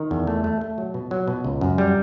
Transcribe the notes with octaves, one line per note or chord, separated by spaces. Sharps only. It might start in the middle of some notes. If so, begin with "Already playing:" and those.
Already playing: D#3
E2
A3
A3
A3
F#3
B2
F#3
B2
C#2
F#2
G3